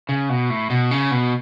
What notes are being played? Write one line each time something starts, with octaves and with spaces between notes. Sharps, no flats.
C#3
B2
A2
B2
C#3
B2